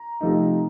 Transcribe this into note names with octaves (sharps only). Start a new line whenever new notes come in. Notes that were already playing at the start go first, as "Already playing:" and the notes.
Already playing: A#5
C3 F3 A3 D#4